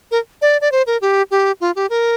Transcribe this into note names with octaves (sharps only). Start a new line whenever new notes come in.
A#4
D5
D5
C5
A#4
G4
G4
F4
G4
A#4